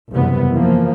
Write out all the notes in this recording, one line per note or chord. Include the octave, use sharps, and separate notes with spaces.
F#1 E2 C3 G3 B3
E3 F3 A#3